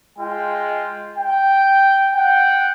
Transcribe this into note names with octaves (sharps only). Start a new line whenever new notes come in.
G#3 F4 G5
G5
F#5 G5